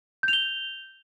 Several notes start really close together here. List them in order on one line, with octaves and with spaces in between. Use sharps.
G6 F7 G7